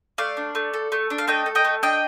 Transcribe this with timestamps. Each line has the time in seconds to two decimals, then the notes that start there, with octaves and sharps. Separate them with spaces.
0.18 A3 D5 F5
0.37 D4
0.55 A3
0.74 A4
0.92 A3
1.10 D4
1.18 F5
1.28 A3 D#5 G5
1.46 A4
1.55 D#5 G5
1.65 A3
1.83 D4 D#5 G5